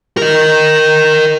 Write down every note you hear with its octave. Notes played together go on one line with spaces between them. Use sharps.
A#4 D#5